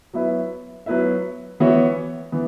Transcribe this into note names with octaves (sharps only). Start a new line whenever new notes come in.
F#3 B3 E4 B4 E5
F#3 B3 E4 B4 E5
E3 B3 F#4 C#5 E5
E3 B3